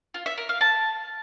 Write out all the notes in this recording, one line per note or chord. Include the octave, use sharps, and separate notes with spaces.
F4
E5
A#4
F5
A5